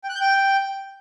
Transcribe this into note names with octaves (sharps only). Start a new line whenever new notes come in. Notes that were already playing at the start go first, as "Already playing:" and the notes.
G5
F#6
G6
G5